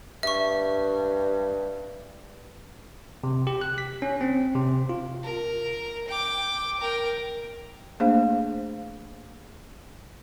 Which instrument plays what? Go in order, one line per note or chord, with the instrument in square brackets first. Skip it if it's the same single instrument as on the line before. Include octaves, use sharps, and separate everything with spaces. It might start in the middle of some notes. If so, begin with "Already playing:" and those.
[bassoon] G2 [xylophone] E5 C#6
[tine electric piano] C3
G4
F#6
B6
C#4
C4
C3
F4
[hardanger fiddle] A#4
G5 D6
A#4 G5
[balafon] A3 A#3 D4 G#4 C5 F5